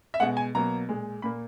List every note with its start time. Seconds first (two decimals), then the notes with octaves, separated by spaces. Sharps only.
0.14 E5
0.20 B2 G#3 F#5
0.37 G#5
0.55 B2 F#3 A#3 A#5
0.89 A#2 G#3
1.22 A#2 A#3 B5